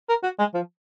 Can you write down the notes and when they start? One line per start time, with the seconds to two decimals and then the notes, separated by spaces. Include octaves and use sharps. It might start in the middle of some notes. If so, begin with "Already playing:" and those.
0.09 A#4
0.24 F#4
0.39 G#3
0.54 F3